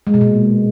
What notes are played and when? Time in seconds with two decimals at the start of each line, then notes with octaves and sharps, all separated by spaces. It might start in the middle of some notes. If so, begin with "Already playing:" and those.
0.07 G#3
0.14 B2
0.21 A#2